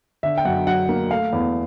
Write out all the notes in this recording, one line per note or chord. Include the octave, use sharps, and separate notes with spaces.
D3 E5
G5
F#2 F#5
F#3 F#5
A#3
A3 F5
E2